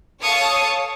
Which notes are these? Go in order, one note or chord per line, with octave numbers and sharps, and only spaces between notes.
A4 C#5 F5 A5 C#6 D#6